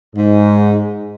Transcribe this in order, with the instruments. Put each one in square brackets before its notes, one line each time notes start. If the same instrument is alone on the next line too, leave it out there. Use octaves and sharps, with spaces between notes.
[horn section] G#2